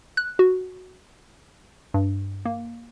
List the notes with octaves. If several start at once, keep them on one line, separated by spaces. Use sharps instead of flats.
F#6
F#4
G2
A#3